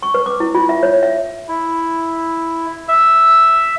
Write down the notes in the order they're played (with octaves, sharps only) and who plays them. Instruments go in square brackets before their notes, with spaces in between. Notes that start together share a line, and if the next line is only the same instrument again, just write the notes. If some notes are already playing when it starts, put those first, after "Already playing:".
[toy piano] C#6
B4
D6
E4
F4
E5
C#5
E5
[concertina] E4
E5